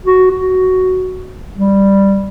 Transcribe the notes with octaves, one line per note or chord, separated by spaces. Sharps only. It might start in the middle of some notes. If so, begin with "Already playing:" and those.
F#4
F#4
G3